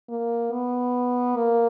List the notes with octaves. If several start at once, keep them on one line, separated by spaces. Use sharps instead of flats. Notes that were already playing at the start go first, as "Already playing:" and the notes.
A#3
B3
A#3